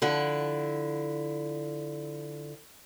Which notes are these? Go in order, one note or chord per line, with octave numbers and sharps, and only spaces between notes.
D3 F3 E4 F#5